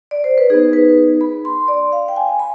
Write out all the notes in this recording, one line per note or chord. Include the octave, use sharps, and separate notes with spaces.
D5
C5
B4
B3 D#4 G#4
B4
B5
C6
D5
F5
G5
G#5
B5